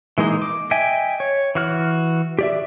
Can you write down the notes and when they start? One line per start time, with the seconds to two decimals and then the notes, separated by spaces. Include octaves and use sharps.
0.18 E3 G#3 A#3 D#4
0.42 D6
0.71 D#5 E5 G5 G#5
1.20 C#5
1.55 E3 F#4 F6
2.39 G4 D5 E5